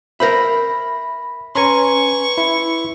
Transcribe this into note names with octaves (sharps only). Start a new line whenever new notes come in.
A#4 C5 E5 B5 A#6
C#4 B4 G#5 A#5 C6 C#6
E4